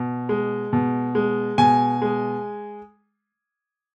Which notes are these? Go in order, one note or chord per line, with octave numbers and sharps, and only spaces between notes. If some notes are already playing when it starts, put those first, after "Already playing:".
Already playing: B2
G#3
B2
G#3
B2 G#5
G#3